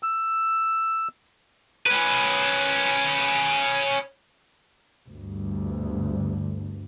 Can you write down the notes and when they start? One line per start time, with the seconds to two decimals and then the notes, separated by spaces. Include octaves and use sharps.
0.03 E6
1.87 C#4 B4
5.10 G1 D2 G2